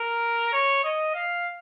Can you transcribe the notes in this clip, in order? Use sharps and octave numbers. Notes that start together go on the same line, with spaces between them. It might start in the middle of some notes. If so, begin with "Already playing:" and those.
Already playing: A#4
C#5
D#5
F5